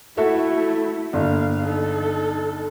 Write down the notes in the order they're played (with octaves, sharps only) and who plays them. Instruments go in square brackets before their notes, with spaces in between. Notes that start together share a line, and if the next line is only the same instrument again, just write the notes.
[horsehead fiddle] A3 E4 [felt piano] F#4 A4 E5
[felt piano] G1 [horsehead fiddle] A#3 F5
[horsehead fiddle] D#4 A4